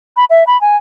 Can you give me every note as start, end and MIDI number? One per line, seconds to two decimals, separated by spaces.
0.17 0.25 83
0.30 0.44 76
0.47 0.60 83
0.61 0.76 80